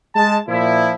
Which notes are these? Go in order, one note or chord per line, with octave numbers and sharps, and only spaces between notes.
G#3 A5
A#2 F3 E4